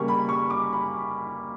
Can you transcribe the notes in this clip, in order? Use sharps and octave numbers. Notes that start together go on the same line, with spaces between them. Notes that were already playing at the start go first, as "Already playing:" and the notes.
Already playing: C#3 G3 A#3 C#6
B5
C#6
D6
B5